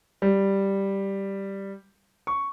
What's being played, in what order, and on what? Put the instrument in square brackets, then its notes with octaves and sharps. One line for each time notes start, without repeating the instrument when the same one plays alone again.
[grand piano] G3
C#6